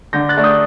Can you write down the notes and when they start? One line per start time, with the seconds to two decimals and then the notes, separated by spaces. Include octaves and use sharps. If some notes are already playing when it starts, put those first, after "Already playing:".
0.13 D3 G6 A#6
0.29 F#6 A6
0.37 A3 D4
0.44 D#6 G6